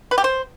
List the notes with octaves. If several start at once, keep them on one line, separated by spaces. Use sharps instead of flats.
B4
G4
C5